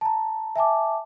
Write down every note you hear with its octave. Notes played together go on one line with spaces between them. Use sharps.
A5 A#5
E5 G#5 A5 D6